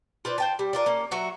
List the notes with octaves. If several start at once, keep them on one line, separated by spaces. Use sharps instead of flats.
F4 B4 C5 D5
C5 G5 A5
G3
D4 F4 A#4
A#3 C#4
F#3 F#4 E5